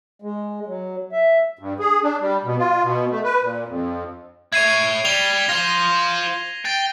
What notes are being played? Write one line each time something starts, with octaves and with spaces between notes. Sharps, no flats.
G#3
F#3
E5
G2
G#4
D4
G3
B2
F4
B2
A3
B4
A#2
F2
E4 C#5 G#6 C7 D#7
G3 F7 G7
F4 C5 A#6 D#7
G5 A6